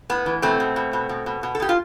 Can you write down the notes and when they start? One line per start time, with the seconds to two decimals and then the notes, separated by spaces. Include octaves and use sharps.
0.10 A2 B3
0.26 E3
0.42 B2 A3 C4
0.60 B2
0.76 B2
0.93 B2
1.09 B2
1.26 B2
1.43 B2
1.55 A4
1.60 B2 G4
1.69 F4